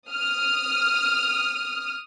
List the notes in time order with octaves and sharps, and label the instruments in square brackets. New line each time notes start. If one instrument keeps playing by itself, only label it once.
[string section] D#6 F6